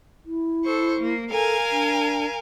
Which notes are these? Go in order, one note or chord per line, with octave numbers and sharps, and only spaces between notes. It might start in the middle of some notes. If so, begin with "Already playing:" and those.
E4
A4 C5 C#6
A#3
A4 A#4 F5 G#5
D4